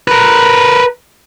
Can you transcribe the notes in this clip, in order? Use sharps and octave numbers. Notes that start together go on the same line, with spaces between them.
A#4 B4